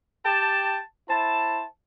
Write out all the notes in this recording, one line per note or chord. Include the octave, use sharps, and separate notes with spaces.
G4 G5 A5
E4 C5 A5